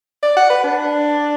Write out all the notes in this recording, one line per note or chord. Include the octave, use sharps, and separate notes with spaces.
D5
F#5
B4
D4